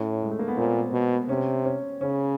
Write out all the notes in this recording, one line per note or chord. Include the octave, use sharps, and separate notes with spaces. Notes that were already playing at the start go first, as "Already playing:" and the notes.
Already playing: A2 C#4
G#3
A3
A#3
B3
A#2 C4
B2
C3 C#4
C#4
C#3 C#4